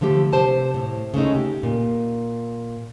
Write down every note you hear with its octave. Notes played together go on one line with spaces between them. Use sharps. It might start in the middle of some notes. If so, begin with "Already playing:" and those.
D3 F3 A3 G4
C3 G4 C5 A5
A2
C#3 G#3 A3 D#4
G4
A#2